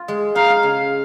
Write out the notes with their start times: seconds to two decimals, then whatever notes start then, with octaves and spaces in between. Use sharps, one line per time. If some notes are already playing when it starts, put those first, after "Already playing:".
Already playing: F4
0.08 G#3
0.35 D#4 F5
0.63 C#3